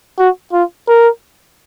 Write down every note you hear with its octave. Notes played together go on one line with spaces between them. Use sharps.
F#4
F4
A#4